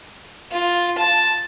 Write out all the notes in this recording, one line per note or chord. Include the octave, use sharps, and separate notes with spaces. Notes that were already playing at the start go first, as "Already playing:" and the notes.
F4
A5